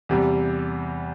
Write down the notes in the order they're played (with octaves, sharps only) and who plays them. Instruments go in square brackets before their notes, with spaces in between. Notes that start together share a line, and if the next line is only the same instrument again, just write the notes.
[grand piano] E2 C3 G3